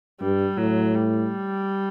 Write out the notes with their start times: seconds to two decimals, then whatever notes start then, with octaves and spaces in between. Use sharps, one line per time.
0.21 G2 G3
0.57 A2 F#3
0.94 G3